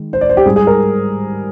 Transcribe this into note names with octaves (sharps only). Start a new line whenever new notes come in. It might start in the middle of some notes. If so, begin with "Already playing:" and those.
Already playing: D#3 G#3
C5
D5
C5
G4
G#2 G3 G#4
G#4
A#4